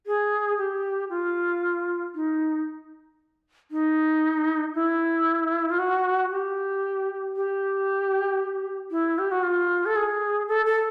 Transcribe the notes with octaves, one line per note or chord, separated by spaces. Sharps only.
G#4
G4
F4
D#4
D#4
E4
F4
F#4
G4
G4
E4
G4
F#4
F4
A4
G#4
A4
A4